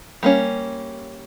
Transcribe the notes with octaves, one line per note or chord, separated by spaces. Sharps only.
G3 A#3 C#4